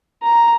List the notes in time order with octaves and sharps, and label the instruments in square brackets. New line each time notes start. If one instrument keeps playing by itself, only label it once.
[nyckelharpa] A#5